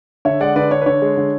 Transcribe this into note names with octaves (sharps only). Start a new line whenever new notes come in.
D3 C#5 E5
G#3 D5 F#5
D3 B4 D5
D4 C#5
B4
D3 C#5
G#3
D3